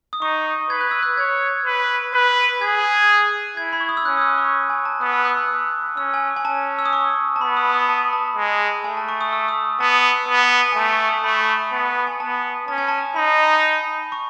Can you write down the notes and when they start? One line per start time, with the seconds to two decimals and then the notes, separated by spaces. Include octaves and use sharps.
0.13 D#6
0.22 D#4 C#6
0.70 B4 G#6
0.81 F#6
0.91 E6
1.03 F#6
1.18 C#5 G#6
1.65 B4
2.14 B4 F#6
2.61 G#4 G#6
3.57 E4 G#6
3.73 B5
3.80 C#6
3.89 D#6
3.97 E6
4.05 C#4 F#6
4.17 D#6
4.21 E6
4.38 C#6
4.70 G#5
4.85 A5
5.01 B3 D#6
5.13 E6
5.25 F#6
5.37 E6
5.97 C#4 E6
6.14 G#5
6.37 G#5
6.45 C#4 A5
6.79 E6
6.85 D#6
6.93 C#6
7.36 A5
7.41 B3 B5
7.57 D#6
7.73 D#6
7.89 A5
8.01 B5
8.13 A5
8.36 G#3
8.84 A3 G#5
8.97 A5
9.09 C#6
9.21 D#6
9.33 E6
9.48 D#6
9.80 B3 A5
10.28 B3
10.72 G#5
10.76 A3 A5
10.92 C#6
11.08 D#6
11.24 A3 B5
11.72 B3
12.07 G#5
12.20 B3 A5
12.68 C#4 A5
12.78 G#5
12.88 A5
13.16 D#4 B5
14.12 C#6